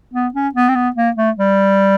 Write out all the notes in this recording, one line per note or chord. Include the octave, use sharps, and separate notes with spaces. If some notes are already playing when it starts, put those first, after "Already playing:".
B3
C#4
B3
C4
B3
A#3
A3
G3